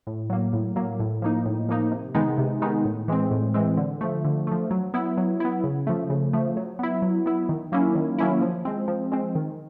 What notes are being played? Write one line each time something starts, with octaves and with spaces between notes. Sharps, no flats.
A2
F#3 A#3
A2
F#3 A#3
A2
F3 A#3 D#4
A2
F3 A#3 D#4
C3
D#3 G#3 B3 D#4
C3
D#3 G#3 B3 D#4
A2
E3 G#3 C4
A2
E3 G#3 C4
D3
F3 A3
D3
F3 A3
F#3
B3 E4
F#3
B3 E4
C#3
F3 A3
C#3
F3 A3
F#3
B3 E4
F#3
B3 E4
D#3
F#3 A#3 C#4 E4
D#3
F#3 A#3 C#4 E4
F3
G#3 C4
F3
G#3 C4
D#3